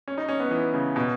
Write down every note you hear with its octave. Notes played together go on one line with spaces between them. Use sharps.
C#4
D#4
C#4
B3
E3
C#3
B2